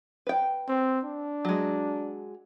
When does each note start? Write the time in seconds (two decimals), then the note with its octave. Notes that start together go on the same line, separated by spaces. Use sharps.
0.27 B4 G5
0.69 C4
1.05 D4
1.45 F#3 G#3